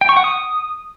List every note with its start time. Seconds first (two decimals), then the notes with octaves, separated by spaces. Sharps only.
0.01 G5
0.09 C#6
0.16 F#5
0.24 D#6